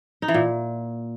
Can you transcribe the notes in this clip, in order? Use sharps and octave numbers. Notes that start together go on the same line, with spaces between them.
D#4
E3
A#2